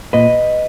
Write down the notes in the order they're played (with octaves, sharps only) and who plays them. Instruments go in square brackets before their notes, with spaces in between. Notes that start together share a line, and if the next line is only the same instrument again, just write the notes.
[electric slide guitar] A#2 B4 D#5